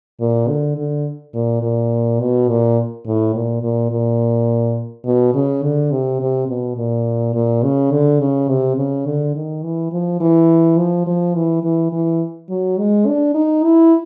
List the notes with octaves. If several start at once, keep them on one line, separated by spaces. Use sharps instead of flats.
A#2
D3
D3
A#2
A#2
B2
A#2
A2
A#2
A#2
A#2
B2
C#3
D3
C3
C3
B2
A#2
A#2
C#3
D3
C#3
C3
C#3
D3
D#3
E3
F3
E3
F3
F3
E3
E3
E3
F#3
G#3
D4
D#4
E4